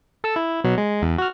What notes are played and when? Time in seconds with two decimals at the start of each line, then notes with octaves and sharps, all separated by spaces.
0.24 A4 E6
0.36 E4
0.64 B2 F#3
0.78 G#3
1.02 E2
1.18 F#4 F6